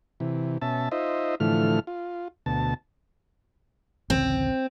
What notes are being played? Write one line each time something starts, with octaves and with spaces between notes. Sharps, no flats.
C3 E3
B2 C#4 E5 A5
D#4 F4 C5 D#5 E5
A2 D3 E3 F3 A3 F6
F4
D2 B2 A5
A1 D2 C#3 C4